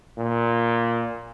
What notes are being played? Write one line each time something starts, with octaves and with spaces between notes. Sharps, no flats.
A#2